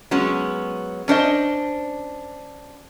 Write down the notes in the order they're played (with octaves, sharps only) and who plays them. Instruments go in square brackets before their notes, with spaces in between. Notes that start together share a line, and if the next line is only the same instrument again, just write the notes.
[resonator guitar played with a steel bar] F#3 G#3 B3 C#4
C#4 D4 C5 D#5